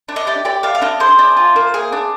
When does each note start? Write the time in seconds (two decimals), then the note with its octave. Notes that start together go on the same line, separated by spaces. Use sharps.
0.09 D4
0.16 D#5
0.27 G4 D5
0.45 G4 D5
0.63 D4 F5
0.75 F5
0.82 D4 D#5
1.00 G#4 C5
1.19 D4
1.37 F4
1.56 A#3
1.74 G#4
1.92 D4